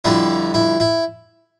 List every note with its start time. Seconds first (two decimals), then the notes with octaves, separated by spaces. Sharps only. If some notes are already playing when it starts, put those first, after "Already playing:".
0.05 F2 D3 G3 E4
0.54 E4
0.80 E4